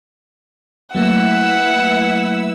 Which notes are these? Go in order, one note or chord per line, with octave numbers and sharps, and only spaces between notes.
F#3 A3 A#3 E4 B4 F#5 E6